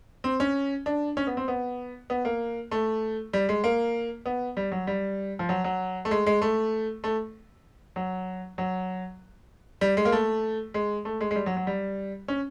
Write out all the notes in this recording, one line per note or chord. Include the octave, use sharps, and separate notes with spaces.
C4
C#4
D4
C#4
B3
C4
B3
B3
A#3
A3
G3
G#3
A#3
B3
G3
F#3
G3
F3
F#3
F#3
A3
G#3
G#3
A3
A3
F#3
F#3
G3
G#3
A#3
A3
G#3
A3
G#3
G#3
G3
F#3
F#3
G3
C#4